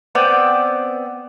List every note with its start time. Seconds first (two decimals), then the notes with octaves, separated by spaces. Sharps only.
0.15 B3 C4 D5 G5